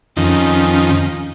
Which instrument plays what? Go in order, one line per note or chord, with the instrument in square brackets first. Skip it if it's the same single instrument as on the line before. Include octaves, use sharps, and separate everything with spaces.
[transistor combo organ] F2 D#3 [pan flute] C#4